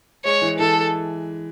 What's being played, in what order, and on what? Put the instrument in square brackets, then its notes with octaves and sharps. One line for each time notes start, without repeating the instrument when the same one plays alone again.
[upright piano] G#3 [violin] C#5
[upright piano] E3
[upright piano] E3 [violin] A4